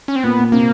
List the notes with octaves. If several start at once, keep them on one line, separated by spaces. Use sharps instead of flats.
C#4
C4
A#2 B3
A#2
C3 A#3